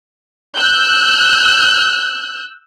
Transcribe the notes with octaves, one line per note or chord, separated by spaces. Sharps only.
E6 F#6 G6